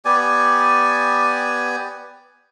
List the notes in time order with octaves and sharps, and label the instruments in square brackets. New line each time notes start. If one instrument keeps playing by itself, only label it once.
[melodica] B3 G4 D5 G#5